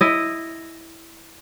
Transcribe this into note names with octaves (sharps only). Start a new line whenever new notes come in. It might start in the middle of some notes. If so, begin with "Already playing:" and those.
E4 D#5